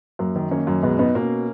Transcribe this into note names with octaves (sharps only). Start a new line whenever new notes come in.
F#2 A#3
D#3
D#3 A#3 C#4
F#2
B2 G#3 B3
B2 B3 D#4
B2 A#3 C#4